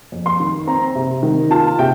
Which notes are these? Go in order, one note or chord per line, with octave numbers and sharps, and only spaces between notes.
F2
C6
D#3
C4 A#5
C3
D#3
F4 A5
C3 G5